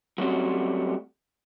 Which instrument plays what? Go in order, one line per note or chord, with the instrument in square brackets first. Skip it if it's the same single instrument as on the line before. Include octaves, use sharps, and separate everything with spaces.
[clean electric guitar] F#3 G3 A3 C4 C#4 F#4